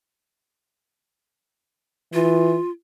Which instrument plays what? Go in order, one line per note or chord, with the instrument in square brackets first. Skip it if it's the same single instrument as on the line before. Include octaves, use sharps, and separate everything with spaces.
[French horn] E3 [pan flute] F4